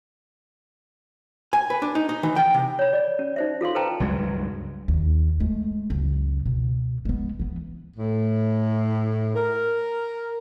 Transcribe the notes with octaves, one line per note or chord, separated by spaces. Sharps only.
G#5
B4
D4
D#4
D#4
E3
G5
C3
C#5 B5
D5
C#4
D#4 C5 E5
F4 A4 F5 C6
A4 B4 C5 G5 A5 A#5
C#2 G2 F#3 G#3
D#2
G#3 A3
C#2 F#2
B2
G#3 B3
E3 B3
A2
A#4